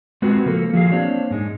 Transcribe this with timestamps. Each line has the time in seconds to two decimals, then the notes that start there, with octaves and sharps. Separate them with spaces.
0.22 G#3 C4 F4 F#4 B4
0.46 C#3 F3 A#3 A4
0.73 F3 F#3 G#4 F5
0.92 A#3 C4 D4 C#5
1.31 G#2 G#3 D#4